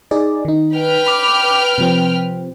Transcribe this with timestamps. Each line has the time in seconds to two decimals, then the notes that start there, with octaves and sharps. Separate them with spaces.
0.11 D#4 G#4 D5
0.45 D#3 D#4
0.74 B4 G5 F6
1.06 B5 D6
1.78 C3 F3 C4